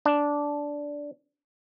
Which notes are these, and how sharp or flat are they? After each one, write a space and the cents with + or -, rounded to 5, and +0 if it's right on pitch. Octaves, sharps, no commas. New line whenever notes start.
D4 -10